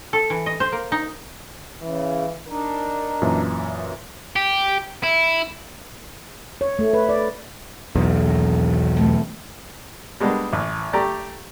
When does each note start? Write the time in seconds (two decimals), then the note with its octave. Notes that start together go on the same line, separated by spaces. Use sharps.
0.13 A4
0.30 E3
0.46 D#5
0.60 C5
0.72 A#3
0.92 D#4
1.82 C#3 E3
2.48 D4 D#4 A#4
3.22 F#2 A#2 E3
4.36 G4
5.03 E4
6.61 C#5
6.79 A3
6.94 B4
7.09 D5
7.95 B1 E2 F4 A#4 D5
8.26 D#2 A#4
8.96 B2 A3 C4
10.20 G3 G#3 A#3 B3 D4
10.53 A1
10.93 A3 G4 D5 A#5